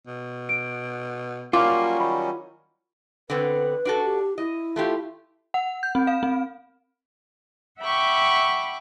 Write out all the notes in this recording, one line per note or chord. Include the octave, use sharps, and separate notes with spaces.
B2
D7
F#3 G3 A#3 C#4 F4 D6
D#3 B5
D3 B3 C4 B4
D4 F#4 A4
G4
E4 D#5
A3 F4 G4
F#5
G6
C4
F5
C4
E5 F#5 G5 B5 C#6 D6